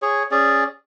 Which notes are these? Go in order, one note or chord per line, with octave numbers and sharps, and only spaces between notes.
G#4 C#5
C#4 G#4 D5